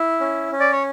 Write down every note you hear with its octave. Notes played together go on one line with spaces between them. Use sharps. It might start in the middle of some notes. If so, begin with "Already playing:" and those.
Already playing: E4
C#4
C#4
D5
C#5